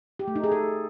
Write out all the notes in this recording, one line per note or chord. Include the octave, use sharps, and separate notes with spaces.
G4
A3
D#4
G#4
A4